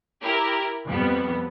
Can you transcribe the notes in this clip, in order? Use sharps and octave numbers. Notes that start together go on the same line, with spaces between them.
E4 G4 A#4
F2 G3 B3